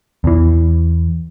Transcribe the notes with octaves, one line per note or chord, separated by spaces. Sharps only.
E2 E3